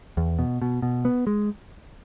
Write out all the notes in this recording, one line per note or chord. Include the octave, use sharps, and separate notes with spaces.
E2
B2
B2
B2
B3
G#3